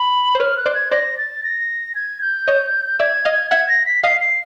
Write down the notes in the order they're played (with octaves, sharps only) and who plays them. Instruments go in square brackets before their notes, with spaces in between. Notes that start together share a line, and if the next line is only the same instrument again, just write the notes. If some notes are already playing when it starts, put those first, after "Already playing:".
Already playing: [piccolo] B5
[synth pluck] C5
[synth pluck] B4 C#5 [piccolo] F6
[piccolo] F#6
[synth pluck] C5 D5
[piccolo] G#6
[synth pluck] C5 D5 [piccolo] A#6
[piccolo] A6
A#6
G#6
G6
[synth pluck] C#5 D#5
[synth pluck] D5 E5 [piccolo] G#6
[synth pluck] D#5 F5
[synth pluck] E5 F#5 [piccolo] G#6
[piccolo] A#6
B6
[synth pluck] D#5 F5 [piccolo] C7
[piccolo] C7